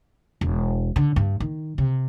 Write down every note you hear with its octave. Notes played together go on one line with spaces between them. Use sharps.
E1
D3
G2
D#3
C3